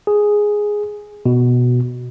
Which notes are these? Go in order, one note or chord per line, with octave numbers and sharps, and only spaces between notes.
G#4
B2